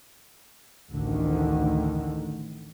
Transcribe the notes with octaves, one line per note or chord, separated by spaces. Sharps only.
A1 D2 D3 D#3